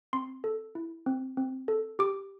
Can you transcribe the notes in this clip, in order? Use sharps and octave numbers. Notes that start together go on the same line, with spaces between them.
C4 C6
A4
E4
C4
C4
A4
G4 D6